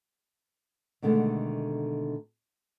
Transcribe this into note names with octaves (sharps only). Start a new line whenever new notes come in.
B2 D3 D#3 G#3 A3